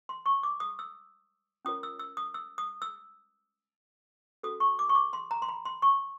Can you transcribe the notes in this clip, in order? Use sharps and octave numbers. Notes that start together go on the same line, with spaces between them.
C6
C#6
D6
D#6
E6
C#4 F4 A#4 C#5 D#6
E6
E6
D#6
E6
D#6
E6
C#4 F#4 A4 D#6
C#6
D6
C#6
D6
C6
A#5
C6
B5
C6
C#6